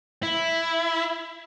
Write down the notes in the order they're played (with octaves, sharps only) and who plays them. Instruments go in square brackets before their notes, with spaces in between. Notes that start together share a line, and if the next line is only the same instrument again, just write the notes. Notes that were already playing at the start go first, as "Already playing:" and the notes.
[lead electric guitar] E4